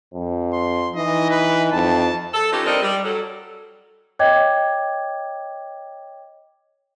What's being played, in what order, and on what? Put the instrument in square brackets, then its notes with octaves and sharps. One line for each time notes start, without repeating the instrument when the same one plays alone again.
[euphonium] F2
[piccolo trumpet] C6
[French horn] E3 [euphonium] D#4 [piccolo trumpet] D#5
[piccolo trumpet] B4
[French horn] F2 [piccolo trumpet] A5
[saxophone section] A4
C#4 D#4 F4 G4 A4 B4
G3 C4 D4 A4 A#4 D#5
G3
F#3 A4
[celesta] C#5 D#5 G5 D6 G#6